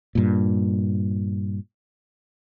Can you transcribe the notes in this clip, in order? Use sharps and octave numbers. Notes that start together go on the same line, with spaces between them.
G2 A#2